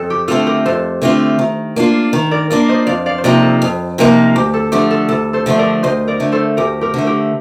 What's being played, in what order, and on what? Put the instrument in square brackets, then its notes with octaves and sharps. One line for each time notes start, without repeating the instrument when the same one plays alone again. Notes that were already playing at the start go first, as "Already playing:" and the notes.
Already playing: [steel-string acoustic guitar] F2 [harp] A4
[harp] G4
[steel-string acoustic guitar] D3 A3 C4 F4 [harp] A4
[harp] G4 A#4
[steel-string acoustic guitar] F2 [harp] A4 C5
[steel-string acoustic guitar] D3 A3 C4 F4
D#3
A#3 D4 F4
D#3
[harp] A#4 D5
[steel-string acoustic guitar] A#3 D4 F4 [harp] A#4 D5
[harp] C5 D#5
[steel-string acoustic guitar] F2 [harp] D5 F5
[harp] D5 F5
C5
[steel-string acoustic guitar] C3 F3 A#3 D#4 [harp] A#4 D5
[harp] A4
[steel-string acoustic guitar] F2
C3 F3 A#3 D#4
[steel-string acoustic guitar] D2 [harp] G4
[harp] A4
[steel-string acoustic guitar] D3 F3 A3 D4 [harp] G4
[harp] A4
[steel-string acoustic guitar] D2 [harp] A4
[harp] A4 C5
[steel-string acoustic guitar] D3 F3 A3 D4
[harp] A#4 D5
[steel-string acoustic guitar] D2 [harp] C5 D#5
[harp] A#4 D5
[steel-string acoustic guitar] D3 A3
[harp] A4 C5
[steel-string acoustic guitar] D2 [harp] G4 A#4
[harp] G4 A#4
[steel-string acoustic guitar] D3 A3
[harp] G4 A#4